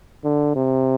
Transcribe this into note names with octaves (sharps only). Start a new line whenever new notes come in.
D3
C3